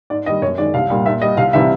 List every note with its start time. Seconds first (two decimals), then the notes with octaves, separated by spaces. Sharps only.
0.10 G#2 D5
0.26 D#3 G3 D#5
0.42 F#2 C#5
0.58 D#3 G#3 D5
0.74 C2 F5
0.90 A#2 G3
1.06 A#2 E5
1.22 G3 D#5
1.37 C2 F5
1.53 C3 E3 G3 E5